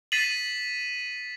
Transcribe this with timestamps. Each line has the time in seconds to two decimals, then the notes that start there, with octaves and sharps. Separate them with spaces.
0.12 A6 B6 C7 D#7 E7 F#7